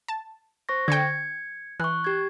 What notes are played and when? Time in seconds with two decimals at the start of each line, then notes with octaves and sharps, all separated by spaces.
0.08 A5
0.69 C5 C#6 A#6
0.88 D3 G5 G#6 C#7
1.80 E3 C#6 F#6
2.04 G4 G#6